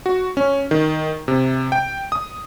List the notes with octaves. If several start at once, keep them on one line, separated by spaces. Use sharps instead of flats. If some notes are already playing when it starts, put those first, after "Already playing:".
F#4
C#4
D#3
C3
G5
D#6